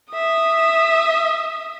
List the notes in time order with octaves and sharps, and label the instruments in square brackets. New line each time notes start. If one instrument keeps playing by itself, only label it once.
[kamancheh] E5 D#6